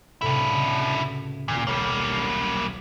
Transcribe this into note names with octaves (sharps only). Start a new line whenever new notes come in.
C#2 A2 C3 D4 E4
C#3 F#4
D#1 A#2
B1 G3 A#3 C#5 B5